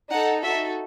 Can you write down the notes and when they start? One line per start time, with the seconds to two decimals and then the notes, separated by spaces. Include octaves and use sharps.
0.11 D#4 A4 F#5
0.43 D#4 F#4 A4 E5